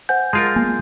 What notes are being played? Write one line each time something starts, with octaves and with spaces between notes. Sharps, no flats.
C5 F#5 G#5 G6
G#3 F4 A#4 A5 A6
A#3 B3 G#5